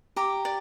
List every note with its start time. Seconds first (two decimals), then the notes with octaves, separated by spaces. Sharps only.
0.16 G4 A#5 D6
0.45 D5